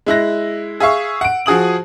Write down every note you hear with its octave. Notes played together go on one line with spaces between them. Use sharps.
G#3 E4 F#6 A#6
G#4 E5 F5 C#6 E6
F#5 D7
F3 F#4 G#4 D#6 F#7